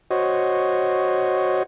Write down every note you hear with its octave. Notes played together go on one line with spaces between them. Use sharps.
F#4 C5 C#5 D#5